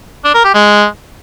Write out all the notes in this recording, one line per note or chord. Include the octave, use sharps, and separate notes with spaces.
D4
A#4
G4
G#3